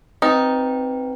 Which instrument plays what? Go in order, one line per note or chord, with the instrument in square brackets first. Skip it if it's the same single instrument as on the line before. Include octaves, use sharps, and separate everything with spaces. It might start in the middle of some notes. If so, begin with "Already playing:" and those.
[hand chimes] C4 B4 G5 [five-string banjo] D#4